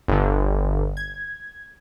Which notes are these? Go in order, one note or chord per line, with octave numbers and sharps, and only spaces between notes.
G1 D3
G#6